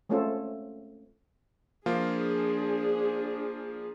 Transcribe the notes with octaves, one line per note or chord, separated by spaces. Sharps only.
G#3 A3 C4 C#4 F4 A4
F3 A#3 D4 F4 G#4